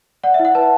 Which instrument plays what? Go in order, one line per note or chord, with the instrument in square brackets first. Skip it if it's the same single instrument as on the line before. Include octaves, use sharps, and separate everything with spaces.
[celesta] D5 F#5
E5
E4
F#5
B4 A5